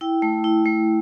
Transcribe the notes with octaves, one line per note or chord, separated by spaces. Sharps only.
E4 G5
A3
E4
A3